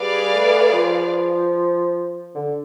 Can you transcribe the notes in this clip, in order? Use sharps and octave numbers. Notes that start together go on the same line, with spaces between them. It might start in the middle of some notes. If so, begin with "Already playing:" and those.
Already playing: G3 G#4 B4 D5 F5
A3
F3
D3